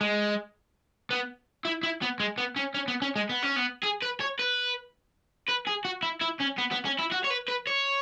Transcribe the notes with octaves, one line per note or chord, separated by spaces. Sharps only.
G#3
B3
E4
E4
B3
G#3
B3
C#4
C#4
B3
C#4
G#3
B3
C#4
B3
G#4
B4
C#5
B4
B4
G#4
F#4
E4
E4
C#4
B3
B3
C#4
E4
F#4
C#5
B4
B4
C#5